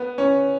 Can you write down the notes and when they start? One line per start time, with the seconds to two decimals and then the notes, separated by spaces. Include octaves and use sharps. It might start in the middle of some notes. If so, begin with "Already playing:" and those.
Already playing: B3
0.18 C#4